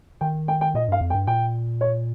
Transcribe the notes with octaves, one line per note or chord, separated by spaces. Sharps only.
D#3 G5
G5
G5
A#2 D#5
G2 F5
F2
G5
G2
A#2 G5
C#5